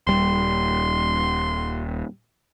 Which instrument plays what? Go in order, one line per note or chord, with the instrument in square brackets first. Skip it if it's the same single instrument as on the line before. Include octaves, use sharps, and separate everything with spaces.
[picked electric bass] D#1 G3 [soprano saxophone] C6